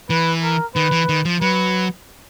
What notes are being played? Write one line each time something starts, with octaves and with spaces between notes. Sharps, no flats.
E3 B4
A#4
D#3 B4
E3
D#3
F3
F#3 B4